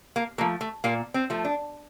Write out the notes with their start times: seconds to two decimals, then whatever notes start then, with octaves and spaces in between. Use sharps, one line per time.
0.16 A#3
0.38 F3 A3 A#3
0.61 A3
0.84 A#2 A#3
1.14 C4
1.30 F3 A3
1.45 D4